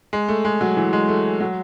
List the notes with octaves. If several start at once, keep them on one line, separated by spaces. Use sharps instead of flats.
G#3
A3
G#3
F#3
E3
G#3
A3
F#3